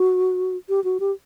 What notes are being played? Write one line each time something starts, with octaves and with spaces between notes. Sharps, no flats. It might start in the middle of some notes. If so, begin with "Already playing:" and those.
Already playing: F#4
G4
F#4
G4